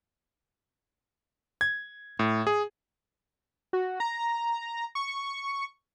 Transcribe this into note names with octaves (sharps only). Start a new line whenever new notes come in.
G#6
A2
G#4
F#4
A#5
C#6